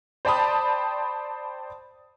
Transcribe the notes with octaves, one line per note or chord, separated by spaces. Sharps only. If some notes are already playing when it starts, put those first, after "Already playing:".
C5 D5 G5 A5 B5 D#6